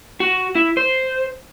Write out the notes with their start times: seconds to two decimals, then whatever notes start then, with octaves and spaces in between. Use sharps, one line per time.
0.20 F#4
0.55 E4
0.77 C5